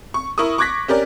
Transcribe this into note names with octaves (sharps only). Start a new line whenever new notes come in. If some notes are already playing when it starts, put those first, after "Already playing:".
C#6
E4 A#4 C#6 D#6
C#6 D6 F#6 G#6 A#6 B6
C#4 G4 A#4 D5